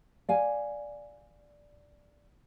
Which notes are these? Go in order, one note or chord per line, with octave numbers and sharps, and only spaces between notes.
D5 F5 G#5